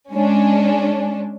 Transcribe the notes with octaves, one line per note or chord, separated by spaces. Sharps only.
G#3 C#4 D4